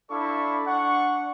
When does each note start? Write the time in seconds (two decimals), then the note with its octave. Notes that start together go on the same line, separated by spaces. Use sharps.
0.11 D4 E4 A4 D5 F5 C#6
0.66 D4 F#5 C#6